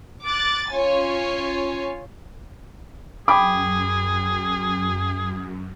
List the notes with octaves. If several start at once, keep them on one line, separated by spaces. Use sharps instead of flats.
D6 F#6 A6
C#4 F4 C#5 G#5
F#2 G#4 G5 B5 D6